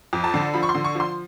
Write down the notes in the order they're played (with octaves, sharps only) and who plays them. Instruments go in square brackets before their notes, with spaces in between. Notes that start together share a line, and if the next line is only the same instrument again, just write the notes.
[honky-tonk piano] F2
A5
D3
F3 B5
C#6
C6
D3
C#6
F3 C6